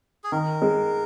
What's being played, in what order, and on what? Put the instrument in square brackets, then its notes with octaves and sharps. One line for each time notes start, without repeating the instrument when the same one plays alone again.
[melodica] G#4
[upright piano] D#3 [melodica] A#4
[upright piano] G#3